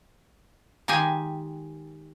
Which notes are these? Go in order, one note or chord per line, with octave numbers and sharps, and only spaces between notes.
D#3 G#3 G4 G#5